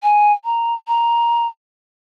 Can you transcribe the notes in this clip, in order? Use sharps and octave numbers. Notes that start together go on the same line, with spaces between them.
G#5
A#5
A#5